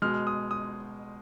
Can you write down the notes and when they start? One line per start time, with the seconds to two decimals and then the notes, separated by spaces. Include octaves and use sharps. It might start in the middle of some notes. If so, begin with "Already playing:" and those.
0.02 B2 G#3 F6
0.14 F6
0.27 D#6
0.51 D#6